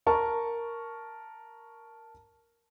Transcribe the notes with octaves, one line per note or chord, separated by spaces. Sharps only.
A#4 A5 C#6